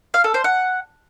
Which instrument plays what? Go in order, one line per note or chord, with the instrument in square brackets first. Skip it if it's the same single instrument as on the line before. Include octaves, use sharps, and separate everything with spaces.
[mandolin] F5
A4
C5
F#5